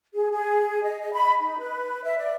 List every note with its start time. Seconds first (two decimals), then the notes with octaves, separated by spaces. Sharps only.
0.14 G#4
0.31 G#4
0.83 D#5
1.01 D#5
1.14 B5
1.41 D#4
1.59 B4
2.03 E5
2.18 D5